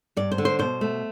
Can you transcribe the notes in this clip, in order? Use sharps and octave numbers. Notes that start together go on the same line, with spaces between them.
G2 D5
C5
D3
C5
B2 C5
A3